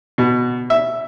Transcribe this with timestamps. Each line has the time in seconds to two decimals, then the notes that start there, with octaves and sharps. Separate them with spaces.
0.18 B2
0.70 E5